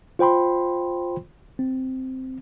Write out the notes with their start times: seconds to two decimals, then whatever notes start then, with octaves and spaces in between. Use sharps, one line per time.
0.19 F4 C5 G5 B5 C6
1.59 C4